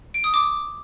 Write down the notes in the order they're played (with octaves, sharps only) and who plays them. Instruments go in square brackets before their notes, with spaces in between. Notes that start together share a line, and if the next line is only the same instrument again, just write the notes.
[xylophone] D7
D#6
D6